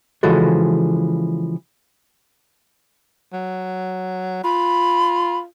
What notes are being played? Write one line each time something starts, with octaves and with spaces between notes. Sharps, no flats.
C#3 E3 F3 G#3 F#4 A4
F#3
F4 B5